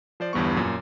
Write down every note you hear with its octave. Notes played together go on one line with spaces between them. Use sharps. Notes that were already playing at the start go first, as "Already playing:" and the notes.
F3 C5 D5
G1 E2 G2 B3 C#6
F#2 A#2